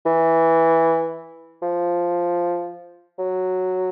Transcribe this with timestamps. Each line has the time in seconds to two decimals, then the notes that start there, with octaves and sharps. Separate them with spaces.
0.06 E3
1.62 F3
3.19 F#3